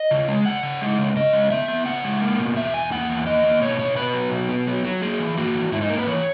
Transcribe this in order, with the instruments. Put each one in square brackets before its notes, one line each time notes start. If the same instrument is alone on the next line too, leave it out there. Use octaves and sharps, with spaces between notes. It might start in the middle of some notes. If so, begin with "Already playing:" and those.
Already playing: [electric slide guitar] D#5
C#3
G#3
C#3 F#5
C#3
G#3
C#3
C#3 D#5
G#3
B3 E5
B3
C#3 F#5
G#3
A#3
B2
E2 E5
E2 G#5
A#3 F#5
E2
A#3 D#5
A#3
B2 C#5
B2 C#5
B3 B4
F#3
B2
B3
F#3
F#3
A#3 G#4
E3
A#3 F#4
E3
G#2 E4
D#4
A#3 A#4
B4
E3 C#5